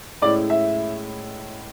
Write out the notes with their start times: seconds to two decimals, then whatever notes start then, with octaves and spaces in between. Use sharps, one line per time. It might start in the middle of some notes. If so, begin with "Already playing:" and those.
0.22 A2 G#3 C#4 E4 D5
0.50 E5